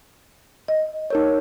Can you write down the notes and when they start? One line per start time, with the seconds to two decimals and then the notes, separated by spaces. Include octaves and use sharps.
0.68 D#5
1.10 D#4 A#4 C#5